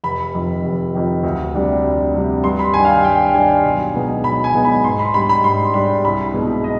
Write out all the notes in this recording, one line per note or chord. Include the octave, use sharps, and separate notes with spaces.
F1 B5
F2 D#3
F1
F2 D#3
D2
C3 G3 D4
D2
C3 G3 D4
G2 C6
B5
D#3 G3 D4 G#5
F5
G5
G2 G5
D#3 G3 D4 G#5
B1
B2 G#3 B3 D#4
B1 B5
G#5
B2 G#3 B3 D#4
B5
G#2 C6
B5
G3 D4 B5
B5
G#2 C6
G3 D4 B5
C2 B5
B2 G#3 B3 D#4
D#5